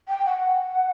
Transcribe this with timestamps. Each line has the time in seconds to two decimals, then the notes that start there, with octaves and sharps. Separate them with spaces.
0.08 G5
0.26 F#5